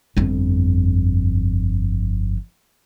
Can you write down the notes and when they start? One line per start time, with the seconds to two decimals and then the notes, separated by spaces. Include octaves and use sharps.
0.17 G1 F2